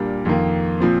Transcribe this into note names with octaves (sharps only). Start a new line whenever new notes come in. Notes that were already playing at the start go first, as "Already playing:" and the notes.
Already playing: A#2 G3 D4 G4 A#4
F2 D#3 A#3
A#2 F3 C4